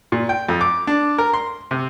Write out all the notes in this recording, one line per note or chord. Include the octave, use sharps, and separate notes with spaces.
A#2
G5
F2
D6
D4
A#4
C6
C3